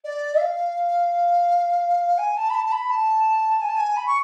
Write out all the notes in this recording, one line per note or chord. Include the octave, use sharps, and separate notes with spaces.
D5
F5
G#5
A5
B5
A5
A5
B5
A5
G#5
A5
G#5
B5
C#6